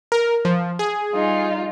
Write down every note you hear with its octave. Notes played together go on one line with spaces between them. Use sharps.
A#4
F3
G#4
G3 D#4 F4